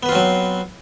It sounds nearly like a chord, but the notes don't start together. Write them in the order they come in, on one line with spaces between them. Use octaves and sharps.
B3 B4 F4 C4 F#3